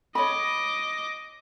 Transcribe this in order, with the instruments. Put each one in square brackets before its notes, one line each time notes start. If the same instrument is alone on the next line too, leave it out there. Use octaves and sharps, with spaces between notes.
[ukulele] C#5 B5 [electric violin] D#5 D6